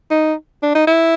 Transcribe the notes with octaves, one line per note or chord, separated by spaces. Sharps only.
D#4
D4
D#4
E4